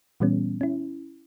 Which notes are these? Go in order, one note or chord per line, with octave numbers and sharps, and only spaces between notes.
A#2 E3 G3 B3 C#4
C#4 E4